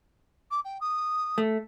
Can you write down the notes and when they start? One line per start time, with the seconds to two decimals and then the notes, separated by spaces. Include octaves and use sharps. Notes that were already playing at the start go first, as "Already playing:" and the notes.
0.51 D6
0.65 G5
0.81 D#6
1.38 A3